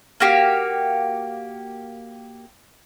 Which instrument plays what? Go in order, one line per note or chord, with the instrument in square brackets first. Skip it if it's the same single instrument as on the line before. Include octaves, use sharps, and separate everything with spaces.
[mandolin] A#3 F#4 G4 F5